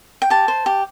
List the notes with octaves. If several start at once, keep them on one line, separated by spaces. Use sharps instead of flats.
G5
G4 A5
C5
G4